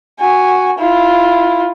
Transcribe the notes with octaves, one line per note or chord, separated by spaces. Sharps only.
F#4 G#5
E4 F4